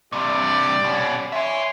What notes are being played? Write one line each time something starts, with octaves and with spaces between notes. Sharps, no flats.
G2 C3 G4 D5
B2 C#4
C#5 E5 G#5 C6